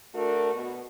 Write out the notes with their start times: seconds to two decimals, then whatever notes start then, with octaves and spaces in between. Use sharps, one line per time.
0.15 A3 D4 F#4 A#4
0.54 B2